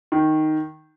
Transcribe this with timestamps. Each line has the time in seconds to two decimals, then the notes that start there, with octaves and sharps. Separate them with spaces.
0.12 D#3